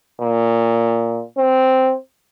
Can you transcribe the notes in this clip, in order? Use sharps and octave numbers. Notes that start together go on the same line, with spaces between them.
A#2
C4